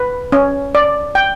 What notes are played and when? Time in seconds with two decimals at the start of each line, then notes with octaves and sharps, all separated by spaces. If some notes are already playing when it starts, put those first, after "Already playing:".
Already playing: B4
0.32 C#4
0.75 D5
1.15 G5